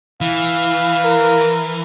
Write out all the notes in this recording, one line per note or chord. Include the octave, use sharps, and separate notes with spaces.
E3 F5
A#4